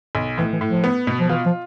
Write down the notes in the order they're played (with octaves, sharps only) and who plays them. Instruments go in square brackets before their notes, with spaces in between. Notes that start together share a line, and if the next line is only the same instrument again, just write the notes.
[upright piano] B1
[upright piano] A2 [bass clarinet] E3
[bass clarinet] E3
[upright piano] A2
[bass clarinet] F3
[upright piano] B3
B2
[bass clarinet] F3
[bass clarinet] E3 [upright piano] F4
[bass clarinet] F3